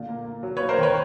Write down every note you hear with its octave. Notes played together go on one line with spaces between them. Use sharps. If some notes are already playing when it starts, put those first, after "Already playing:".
Already playing: A#2 D3
A#3
A#3
F#3
A#3 B4 C#5
A#4 C5
D#3 B4 C#5